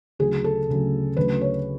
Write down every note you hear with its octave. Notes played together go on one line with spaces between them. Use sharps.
D2 C#3 F#3 G#4
A4
D2 C#3 F#3
D2 C#3 F#3 B4
C#5